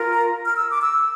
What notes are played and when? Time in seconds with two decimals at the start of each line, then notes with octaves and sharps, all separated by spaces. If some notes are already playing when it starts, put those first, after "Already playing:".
Already playing: F4 A#4
0.14 A#5
0.45 F6
0.58 E6
0.70 D6
0.82 E6